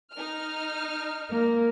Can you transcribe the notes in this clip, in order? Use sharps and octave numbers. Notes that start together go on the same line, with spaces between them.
D#4 F6
A#3